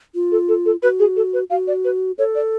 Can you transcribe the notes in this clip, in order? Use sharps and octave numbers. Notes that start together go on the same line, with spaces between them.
F4
A4
A4
A4
F#4 B4
G#4
A4
B4
F#4 F5
D5
B4
A4 C#5
D5